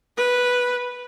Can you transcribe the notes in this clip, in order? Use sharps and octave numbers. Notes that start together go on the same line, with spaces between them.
B4